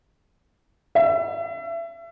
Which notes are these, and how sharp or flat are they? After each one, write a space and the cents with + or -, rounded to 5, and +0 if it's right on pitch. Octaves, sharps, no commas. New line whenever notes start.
E5 +30